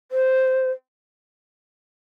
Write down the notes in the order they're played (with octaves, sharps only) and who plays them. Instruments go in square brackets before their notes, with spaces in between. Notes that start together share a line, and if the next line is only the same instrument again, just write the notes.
[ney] C5